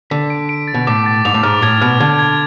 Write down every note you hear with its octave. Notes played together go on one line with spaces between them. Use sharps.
D3 B6
D7
D7
A6
B2
A2 D6
A6
G#2 F7
A2
G#2 F6
A2 G#6
B2 F6
D3 G#6
G#6